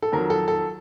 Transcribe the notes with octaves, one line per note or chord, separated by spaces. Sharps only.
A4
F2 D#3 F#3 A#4
A4
A4